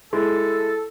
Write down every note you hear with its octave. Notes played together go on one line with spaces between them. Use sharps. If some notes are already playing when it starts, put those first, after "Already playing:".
G#3 E4 A4